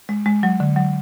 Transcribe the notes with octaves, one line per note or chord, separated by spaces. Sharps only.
G#3
G#3
F#3
D3
F#3